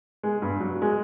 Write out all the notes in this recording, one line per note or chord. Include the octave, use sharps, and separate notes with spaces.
G#3
G2
F#3
G#3